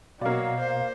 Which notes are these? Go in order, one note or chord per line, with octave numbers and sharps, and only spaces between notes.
B2 F#3 A#3 D5 D#5 F5 F6
C5